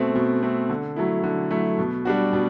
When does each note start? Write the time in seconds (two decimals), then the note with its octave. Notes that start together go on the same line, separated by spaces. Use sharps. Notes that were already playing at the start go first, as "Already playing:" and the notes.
Already playing: B2 A3 C4
0.15 B2
0.43 A3 C4
0.69 D3
0.96 F#3 A3 E4
1.24 D3
1.51 F#3 A3 E4
1.79 B2
2.05 G3 D4 F#4
2.33 B2